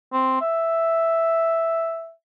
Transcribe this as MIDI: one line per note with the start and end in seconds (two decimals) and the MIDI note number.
0.13 0.40 60
0.41 2.12 76